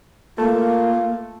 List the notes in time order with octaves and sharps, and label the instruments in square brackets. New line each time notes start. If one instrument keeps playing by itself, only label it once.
[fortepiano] A3 [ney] A#3 [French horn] F4